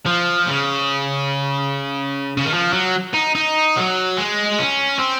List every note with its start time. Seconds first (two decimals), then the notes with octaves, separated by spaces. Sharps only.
0.06 F3
0.48 C#3
2.37 C#3
2.45 D#3
2.53 F3
2.73 F#3
3.14 D#4
3.35 D#4
3.76 F#3
4.17 G#3
4.58 C#4
4.99 C4